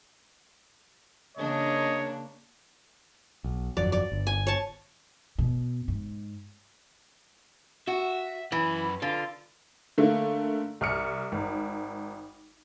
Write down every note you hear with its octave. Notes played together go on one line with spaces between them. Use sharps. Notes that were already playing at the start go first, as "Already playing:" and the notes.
C#3 A#3 D4 C#5 D#5
B1
G1 F2 F#3 D5
D5
G1
G#5
C#5 A5
B2
G#2
F#4 E5
F#2 E3 B5
D3 F4 F5
D3 A3 A#3
C2 F6 C#7
G#1